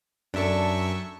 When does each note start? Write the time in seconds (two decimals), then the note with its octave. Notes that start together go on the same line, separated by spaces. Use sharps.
0.34 F#2 D4 A4 E5 C#6